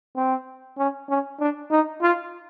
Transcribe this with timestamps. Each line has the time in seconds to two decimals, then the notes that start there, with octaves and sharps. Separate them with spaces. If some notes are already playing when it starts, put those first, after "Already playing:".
0.16 C4
0.78 C#4
1.09 C#4
1.40 D4
1.70 D#4
2.02 F4